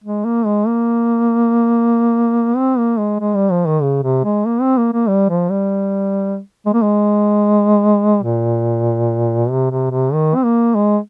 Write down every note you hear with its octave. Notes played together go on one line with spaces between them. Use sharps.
G#3
A#3
G#3
A#3
C4
A#3
G#3
G#3
G3
F3
D#3
C#3
C3
G#3
A#3
C4
A#3
A#3
G3
F3
G3
G#3
A#3
G#3
A#2
C3
C3
C3
D#3
C4
A#3
G#3